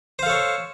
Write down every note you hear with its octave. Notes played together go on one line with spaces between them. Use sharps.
A4 C5 C#5 F5